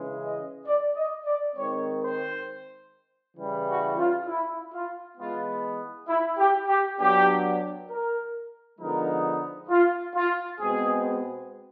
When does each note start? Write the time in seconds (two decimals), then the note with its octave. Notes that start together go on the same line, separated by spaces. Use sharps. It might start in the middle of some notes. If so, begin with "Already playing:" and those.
Already playing: C#3 E3 G#3
0.21 D#5
0.66 D5
0.96 D#5
1.26 D5
1.56 D#3 G#3 C4 C#5
2.01 C5
3.37 C#3 E3 G3
3.68 F#4
3.97 F4
4.27 E4
4.73 F4
5.17 E3 G#3 B3 F4
6.08 E4
6.38 G4
6.68 G4
6.99 F#3 B3 D4 G4
7.89 A#4
8.79 D3 F3 G#3 B3 D#4 A#4
9.69 F4
10.15 F4
10.59 B2 G#3 C4 G#4